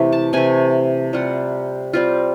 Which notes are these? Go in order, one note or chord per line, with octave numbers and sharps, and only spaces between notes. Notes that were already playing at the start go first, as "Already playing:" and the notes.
Already playing: C3 E3 A3 E5
A5
C3 E3 A3 G#5
G3 C4 F4 F#5
G3 C4 F4